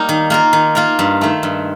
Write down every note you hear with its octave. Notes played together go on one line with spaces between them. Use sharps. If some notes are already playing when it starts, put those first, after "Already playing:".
Already playing: G3 A#3 D#4
D#3
A#3 F4 A#4
D#3
A#3 F4 A#4
G2
D#3 A3
G2